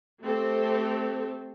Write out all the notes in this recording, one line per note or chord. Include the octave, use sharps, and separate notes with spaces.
A3 C4 G4 A4